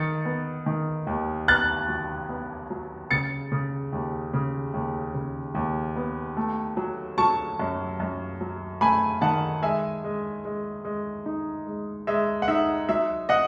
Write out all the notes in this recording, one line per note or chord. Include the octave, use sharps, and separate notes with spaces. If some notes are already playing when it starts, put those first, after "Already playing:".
Already playing: D#3 A6 C#7
B3
D#3
D#2
B3 F#6 A6
F#3
B3
F#3
C#3 A6 C#7
C#3
D#2
C#3
D#2
C#3
D#2
B3
A3
F#3
F#3 A5 C#6
F#2
F#2
F#3
A3 G#5 B5
D#3 F#5 A5
G#3 E5 G#5
G#3
G#3
G#3
D#4
G#3
G#3 E5
F#5
D#4 E5
F#3 E5
D#5 F#5